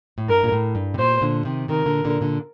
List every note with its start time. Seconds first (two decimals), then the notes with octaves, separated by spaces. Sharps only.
0.18 A2
0.28 G2 A#4
0.44 A#2
0.52 A2
0.75 G2
0.94 C3
0.99 A#2 C5
1.21 A#2 D3
1.45 C3 D#3
1.68 C3 D#3 A#4
1.86 A#2 D3
2.04 A#2 D3
2.21 A#2 D3